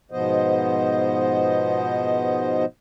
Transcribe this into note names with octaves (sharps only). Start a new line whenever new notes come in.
G#2 B2 F3 B3 C5 D#5